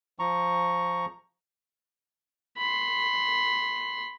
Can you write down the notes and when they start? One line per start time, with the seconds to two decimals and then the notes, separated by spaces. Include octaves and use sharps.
0.19 F3 A#5 C#6
2.57 B5 C6